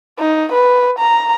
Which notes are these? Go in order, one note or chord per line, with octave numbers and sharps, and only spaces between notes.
D#4
B4
A#5